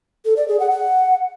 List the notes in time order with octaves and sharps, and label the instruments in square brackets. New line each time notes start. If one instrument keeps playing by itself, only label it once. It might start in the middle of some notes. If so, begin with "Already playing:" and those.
[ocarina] A4
D5
G#4
F#5
F#5